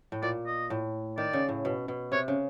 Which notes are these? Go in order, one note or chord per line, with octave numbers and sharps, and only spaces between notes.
A2
A#2 D5
D#5
A2
D#3 D5
C#3
A2
B2
B2
C3 C#5
C#3